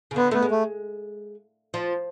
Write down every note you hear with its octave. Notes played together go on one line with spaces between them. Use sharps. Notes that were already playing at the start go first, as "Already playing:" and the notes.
C#3
D3 B3
A3 B3
G#3
A3
F3